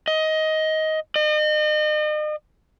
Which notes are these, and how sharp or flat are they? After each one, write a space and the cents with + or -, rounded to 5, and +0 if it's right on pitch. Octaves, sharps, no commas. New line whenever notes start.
D#5 +15
D#5 -40